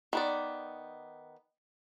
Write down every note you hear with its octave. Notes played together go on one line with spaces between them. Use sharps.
D#3 B3 D5